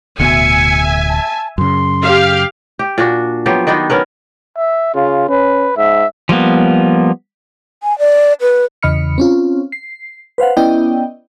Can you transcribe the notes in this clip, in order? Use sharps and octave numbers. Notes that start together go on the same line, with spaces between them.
D1 D2 B2 E5 G#5 C#7
A5
F#2 C#3 C6
G4 F5
G4
A#2 D4 F#4
F3 F#3 B3 G4
D#3 B3 D4 D#4
B3 C#4 A#4 B4
E5
C#3 F4
C#4 B4
G#2 E5
F3 G3 A#3 B3
G#5
D5
B4
E2 C#3 D#5 B5 F6 C#7
C4 C#4 F4
C7
B4 C5 F5 F#5
B3 C#4 E4 D5 D#5 G5